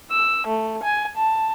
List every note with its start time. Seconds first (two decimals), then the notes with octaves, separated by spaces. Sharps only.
0.10 E6
0.47 A3
0.83 G#5
1.17 A5